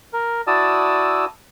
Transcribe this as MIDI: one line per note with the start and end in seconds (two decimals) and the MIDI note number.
0.13 0.41 70
0.47 1.25 64
0.47 1.25 66
0.47 1.25 74
0.47 1.25 81
0.47 1.25 87
0.47 1.25 88